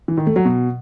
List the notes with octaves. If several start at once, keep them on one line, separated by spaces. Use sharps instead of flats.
E3
D#3
A3
F#3
B2